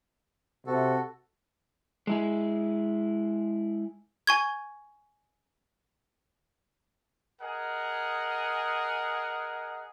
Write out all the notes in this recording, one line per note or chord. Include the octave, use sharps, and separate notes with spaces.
C3 F#4 A4
G#3 E4 G#4
G#5 C#6 G#6
G#4 A#4 D#5 F#5 G#5